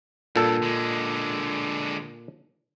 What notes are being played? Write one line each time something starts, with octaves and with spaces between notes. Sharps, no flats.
G2 A#2 A4
D3 G#3